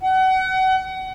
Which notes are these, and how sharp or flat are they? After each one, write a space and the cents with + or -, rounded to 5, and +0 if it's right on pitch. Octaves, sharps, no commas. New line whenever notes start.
F#5 +30